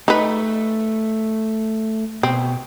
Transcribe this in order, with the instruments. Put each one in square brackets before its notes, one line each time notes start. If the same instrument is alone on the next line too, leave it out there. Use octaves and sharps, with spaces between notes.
[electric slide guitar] A3 [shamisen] D#4 B4
[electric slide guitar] B2 [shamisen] C4